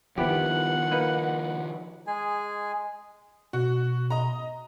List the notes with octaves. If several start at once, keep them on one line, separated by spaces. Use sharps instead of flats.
D#3 F3 B3 E4 G4 F#5
A#3 D#4 B4
G#3 G#4 G#5
B2 F#4
D#5 A#5